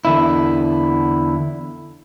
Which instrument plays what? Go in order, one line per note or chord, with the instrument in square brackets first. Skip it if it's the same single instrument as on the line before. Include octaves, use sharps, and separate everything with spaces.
[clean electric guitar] E2 D3 E4